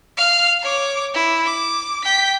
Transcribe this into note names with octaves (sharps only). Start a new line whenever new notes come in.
F5 F6
C#5 D6
E4
D6
G5 B6